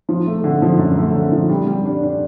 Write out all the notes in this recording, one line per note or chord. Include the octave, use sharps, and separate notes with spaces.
F3
A3
D3
F3
F#2
A3
D3
F3
G3
G3
D4
D4